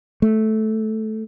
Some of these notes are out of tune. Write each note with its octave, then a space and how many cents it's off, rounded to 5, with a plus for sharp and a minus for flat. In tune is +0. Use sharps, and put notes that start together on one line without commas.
A3 -10